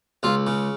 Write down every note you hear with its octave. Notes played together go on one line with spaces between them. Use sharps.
C#2 F4
C#3